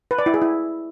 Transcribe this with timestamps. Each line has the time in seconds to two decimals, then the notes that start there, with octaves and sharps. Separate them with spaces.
0.11 B4
0.19 D5
0.26 E4
0.34 G#4
0.42 E4